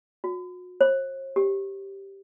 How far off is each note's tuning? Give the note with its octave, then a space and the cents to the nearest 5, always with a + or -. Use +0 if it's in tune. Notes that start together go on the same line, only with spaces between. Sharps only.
F#4 -40
C5 +45
G4 +0